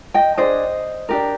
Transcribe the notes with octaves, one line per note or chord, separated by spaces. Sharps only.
D#5 G5
D4 G#4 C5 D#5
D4 G4 A#4